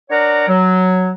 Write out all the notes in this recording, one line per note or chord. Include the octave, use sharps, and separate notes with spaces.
D4 A#4 C#5 D5 F#5 A#5
F#3